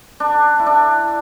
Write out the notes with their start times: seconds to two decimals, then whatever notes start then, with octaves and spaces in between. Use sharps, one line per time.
0.20 D4
0.59 E4
0.66 D4